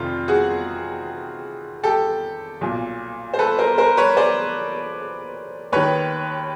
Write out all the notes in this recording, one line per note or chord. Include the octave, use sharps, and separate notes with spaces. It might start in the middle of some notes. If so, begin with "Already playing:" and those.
Already playing: F1 F2 C3 D#3 F4
F#4 G#4
G4 A4
B1 A#2
C5
A4 B4
A#4 C5
A#4 C5
B4 C#5
C5 D5
D#2 D#3 B4 C#5